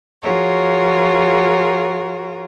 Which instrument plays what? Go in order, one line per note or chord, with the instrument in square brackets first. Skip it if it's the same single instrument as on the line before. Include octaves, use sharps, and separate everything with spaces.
[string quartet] F3 F4 F#4 G#4 A#4 C#5